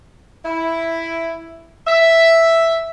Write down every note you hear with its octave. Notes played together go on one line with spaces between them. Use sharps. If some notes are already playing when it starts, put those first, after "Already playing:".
E4
E5